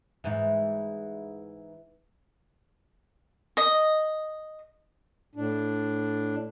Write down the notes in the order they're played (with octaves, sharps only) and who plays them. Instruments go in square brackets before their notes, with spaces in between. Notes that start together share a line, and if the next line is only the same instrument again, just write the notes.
[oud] G#2 E3
[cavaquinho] D#5
[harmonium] A2 D4